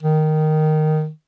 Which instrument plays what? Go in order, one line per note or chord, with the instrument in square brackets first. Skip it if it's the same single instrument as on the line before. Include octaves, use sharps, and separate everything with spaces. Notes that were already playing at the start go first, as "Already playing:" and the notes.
[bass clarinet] D#3